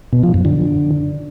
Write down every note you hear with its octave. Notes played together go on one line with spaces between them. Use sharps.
B2
F3
F#2
D3